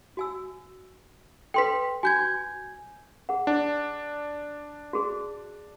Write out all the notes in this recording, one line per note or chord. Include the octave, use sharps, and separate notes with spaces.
F#4 G#5 E6
A4 B4 G5 C6 B6
F#4 G#5 G6 G#6
G#4 F#5
D4
F#4 G#4